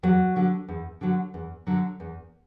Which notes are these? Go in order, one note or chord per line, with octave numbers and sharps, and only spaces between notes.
E2 F#3
D3 F#3
E2
D3 F#3
E2
D3 F#3
E2